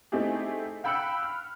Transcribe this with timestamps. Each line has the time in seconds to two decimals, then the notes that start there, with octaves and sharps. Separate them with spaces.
0.12 A3 C4 D#4 E4 G4 G#4
0.84 F5 G5 B5 E6 F#6 C#7
1.23 F6